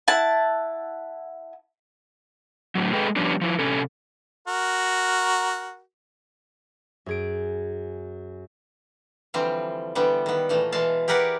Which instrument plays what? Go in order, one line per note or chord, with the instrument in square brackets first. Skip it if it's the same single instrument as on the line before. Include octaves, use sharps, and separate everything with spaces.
[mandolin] E4 F#5 A5
[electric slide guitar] A2 D3 F#3
G#3 G#4 A4 B4 D#5 G5
F3 G3 B3 C#4 D4
F3 E4
C3 C#4 A4
[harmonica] F#4 A#4
[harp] F#2 G#4 D7
[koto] D3 E3 F3 G3 C4
D3 E3 G3 B3
D#3 B3
A#2 E3 A3
B2 E3 G#3 F5 A5
G4 G#4 A#4 B4 D5 F#5